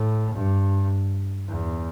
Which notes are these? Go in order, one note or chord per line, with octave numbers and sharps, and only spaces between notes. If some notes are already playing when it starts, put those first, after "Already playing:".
Already playing: A2
G2
E2